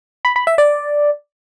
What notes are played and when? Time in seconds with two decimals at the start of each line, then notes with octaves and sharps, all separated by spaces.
0.25 B5
0.36 B5
0.47 E5
0.58 D5